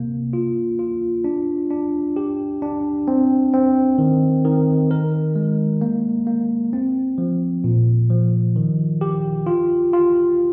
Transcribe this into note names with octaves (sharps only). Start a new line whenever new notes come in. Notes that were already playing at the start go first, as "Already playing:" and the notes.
Already playing: C3 A#3
F4
F4
D4
D4
G4
D4
C4
C4
D#3
D#3
A#4
G#3
A#3
A#3
C4
F3
A#2
F3
D#3
G4
F4
F4